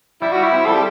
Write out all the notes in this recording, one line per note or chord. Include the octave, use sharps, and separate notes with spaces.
G3 E4
F#4 G4
E4
C4
G3 A4
G4